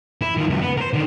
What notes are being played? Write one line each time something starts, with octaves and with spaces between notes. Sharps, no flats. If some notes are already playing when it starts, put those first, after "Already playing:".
E4
D#3 F4
C#2 F#2
B3
A#4 C5
D3 D#3